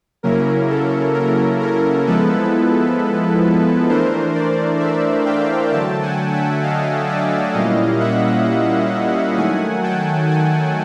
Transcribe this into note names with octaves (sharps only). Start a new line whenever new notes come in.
C#3 F#3 A#3 C#4 E4 A#4
A4
A#4
A#4
F3 G#3 B3 E4 A4 B4
E3 A3 D4 A#4 C5
C5 D5
D5 E5
F5 G5
D3 F#3 A3 G5 A5
F#5 G#5
E5 F#5
D#5 F5
D5 E5
A#2 G3 A#3 C#4 E4 D#5 F5
E5 F#5
D#3 F#3 A3 F#5 G#5
G5 A5
F#5 G#5